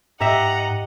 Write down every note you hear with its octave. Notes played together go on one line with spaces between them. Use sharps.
G#2 G4 D#5 E5 F#5 A#5